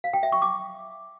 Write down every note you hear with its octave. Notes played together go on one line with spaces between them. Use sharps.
F5
G5
E5
C#6
D6